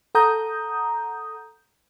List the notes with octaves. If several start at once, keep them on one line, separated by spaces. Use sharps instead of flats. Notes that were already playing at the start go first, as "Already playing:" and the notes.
A4 F#5 A#5 D#6 G6